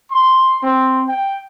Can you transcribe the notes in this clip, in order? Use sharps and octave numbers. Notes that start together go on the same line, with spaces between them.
C6
C4
G5